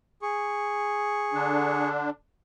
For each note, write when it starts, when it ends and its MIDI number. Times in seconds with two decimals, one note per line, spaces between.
0.22 1.89 68
0.22 1.89 85
1.33 2.10 50
1.33 2.10 62